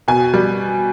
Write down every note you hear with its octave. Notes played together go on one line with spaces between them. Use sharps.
B2 G#5
G3